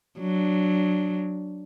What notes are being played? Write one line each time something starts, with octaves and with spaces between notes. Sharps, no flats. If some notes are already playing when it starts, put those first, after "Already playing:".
F#3 D4